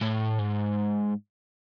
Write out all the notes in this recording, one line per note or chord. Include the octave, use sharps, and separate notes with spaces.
A2
G#2